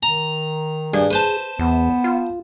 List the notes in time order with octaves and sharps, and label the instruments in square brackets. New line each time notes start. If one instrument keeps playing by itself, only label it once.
[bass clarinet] D#3 [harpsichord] A#5
[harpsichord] G2 [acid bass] G#4
[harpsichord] B4 C5 A5
[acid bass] E2 [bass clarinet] B3
[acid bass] F4